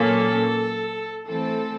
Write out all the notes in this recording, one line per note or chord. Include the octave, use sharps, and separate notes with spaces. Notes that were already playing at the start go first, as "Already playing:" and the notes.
Already playing: A#2 F#3 A#3 C#4 A4
E3 A3 C4 A4